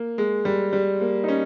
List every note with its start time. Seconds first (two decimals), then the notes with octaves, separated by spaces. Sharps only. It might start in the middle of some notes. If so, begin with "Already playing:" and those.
Already playing: A#3
0.18 G#3
0.45 G3
0.73 G3
1.01 A#3
1.24 D#4
1.28 C#4